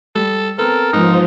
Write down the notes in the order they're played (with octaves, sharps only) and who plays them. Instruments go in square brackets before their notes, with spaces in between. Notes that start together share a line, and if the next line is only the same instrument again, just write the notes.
[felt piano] G3 [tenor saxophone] A4
[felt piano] B3 C4 [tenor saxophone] A4 [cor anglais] A#4
[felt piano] G#2 G#3 B3 [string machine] F3 F4 [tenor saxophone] D#4